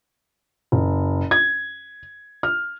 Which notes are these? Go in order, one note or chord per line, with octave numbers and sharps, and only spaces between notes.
F#1
G#6
F6